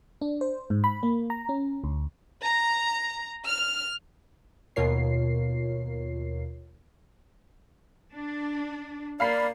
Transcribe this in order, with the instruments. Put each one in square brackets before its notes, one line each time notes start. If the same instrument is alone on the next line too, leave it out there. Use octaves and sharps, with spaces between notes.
[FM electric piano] D4
C5
G#2
B5
A#3
A#5
C#4
D2
[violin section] A#5
F6
[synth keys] D#2 B2 F4 A#4 C#5 C7
[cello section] D4
[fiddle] A#3 [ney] D5 [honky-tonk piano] F5 B5 C7